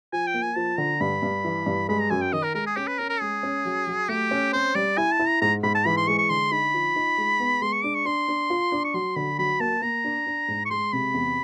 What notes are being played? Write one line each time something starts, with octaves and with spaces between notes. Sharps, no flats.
F3 G#5
G5
A#3
G#5
F3 A5
D3 A#5
G2 B5
G2
E3
G2
G#3 B5
A#5
F#2 G#5
G5
D#3 D#5
A#4
G#3 A#4
G#4
C#4 G4
B4
C#4 A#4
A#4
G#3 G#4
C#4
F#3
F#3
A3 G4
C#4
C4 C5
G3 D5
E4 G#5
A5
E4
A#5
G#2 A#5
G#2 B5
A5
E3 B5
C6
G#3 C#6
C#6
D3 C6
D#4 B5
F3
D#4
G#3
B3
G#3 C6
C#6
D4 D6
C#6
D4 C6
D4
F4
D4
C#6
F#3 C6
D3 B5
F#3 B5
A#3 A5
A#3 A#5
D4
D4
G#2
C#6
G#3 C6
C3 B5
E2